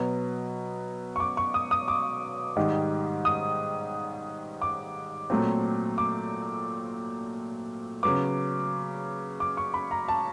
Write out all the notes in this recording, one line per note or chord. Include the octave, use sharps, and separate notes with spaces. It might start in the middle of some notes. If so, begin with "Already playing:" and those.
Already playing: B2 F#3 B3
C#6
D6
C#6
D#6
D#6
D6
G#2 D#3 G3
D#6
D6
A#2 F#3 A3 C4
D6
C#3 F#3 B3 D6
D6
C#6
B5
A#5
A5